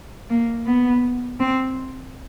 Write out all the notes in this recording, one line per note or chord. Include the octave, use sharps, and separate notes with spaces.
A#3
B3
C4